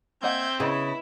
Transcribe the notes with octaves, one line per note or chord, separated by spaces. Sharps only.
A#3 C4 D#5 E5 F#5 G6 G#6
C#3 B3 E4 B4 D#5